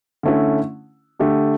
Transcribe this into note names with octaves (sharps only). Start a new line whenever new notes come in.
D3 A3 C#4 E4
D3 A3 D4 G4